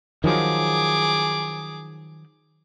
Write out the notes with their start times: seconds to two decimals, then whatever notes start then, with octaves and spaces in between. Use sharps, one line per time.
0.24 D#3 F3 F#3 G#4 D6